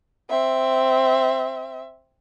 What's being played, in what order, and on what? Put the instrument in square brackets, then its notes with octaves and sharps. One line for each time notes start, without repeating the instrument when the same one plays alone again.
[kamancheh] C4 E5